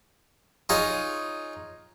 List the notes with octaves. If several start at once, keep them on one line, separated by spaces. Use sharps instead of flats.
D#4 F4 G#4 C#5